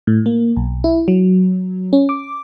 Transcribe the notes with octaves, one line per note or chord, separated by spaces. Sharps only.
A2
A#3
B1
E4
F#3
C#4
D6